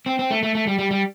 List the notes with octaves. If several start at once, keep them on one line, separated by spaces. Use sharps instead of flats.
C4
C4
A3
A3
A3
G3
G3
G3